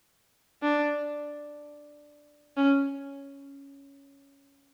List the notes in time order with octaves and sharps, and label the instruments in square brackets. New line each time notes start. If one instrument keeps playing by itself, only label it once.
[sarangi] D4
C#4